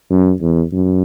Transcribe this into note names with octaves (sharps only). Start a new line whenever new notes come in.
F#2
E2
F#2